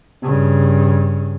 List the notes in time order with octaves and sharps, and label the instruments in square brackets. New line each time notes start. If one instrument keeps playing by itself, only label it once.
[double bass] G2 C#3